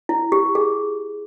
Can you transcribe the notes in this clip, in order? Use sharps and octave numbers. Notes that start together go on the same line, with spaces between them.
E4
G4
G#4